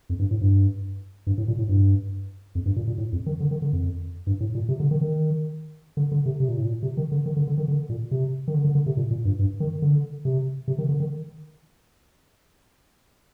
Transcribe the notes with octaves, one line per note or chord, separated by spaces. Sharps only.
F2
G2
A2
G2
G2
A2
A#2
A2
G2
F2
G2
A#2
A#2
A2
F2
D#3
D3
D#3
D3
F2
G2
A2
A#2
C3
D3
D#3
D#3
D3
D3
C3
C3
A#2
A2
A#2
C3
D#3
D3
D#3
D3
D3
D#3
D3
A#2
C3
D#3
D3
D3
D3
C3
A#2
A#2
G2
G2
D#3
D3
C3
C3
D#3
D3
D#3